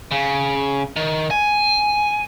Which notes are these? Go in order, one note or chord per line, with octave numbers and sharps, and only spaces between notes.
C#3
D#3
G#5